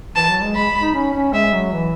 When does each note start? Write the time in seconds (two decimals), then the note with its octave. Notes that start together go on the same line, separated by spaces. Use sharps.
0.16 E3 A5
0.29 F#3
0.43 G#3
0.55 G#3 B5
0.82 D#4
0.95 C#4
1.14 C#4
1.33 G#3 E5
1.53 F#3
1.72 E3